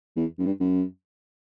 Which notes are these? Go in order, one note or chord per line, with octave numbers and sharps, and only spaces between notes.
E2
F#2
G2
F#2